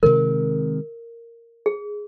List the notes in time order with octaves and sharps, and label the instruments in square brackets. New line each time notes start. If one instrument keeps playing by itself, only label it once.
[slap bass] C3 D#3 G#3 [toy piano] A#4
[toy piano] G#4